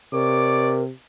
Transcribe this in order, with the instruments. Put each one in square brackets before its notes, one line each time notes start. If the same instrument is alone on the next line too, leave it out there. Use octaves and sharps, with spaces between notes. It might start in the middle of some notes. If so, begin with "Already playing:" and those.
[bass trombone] C3 [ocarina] A#4 [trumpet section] C#5 D5 D6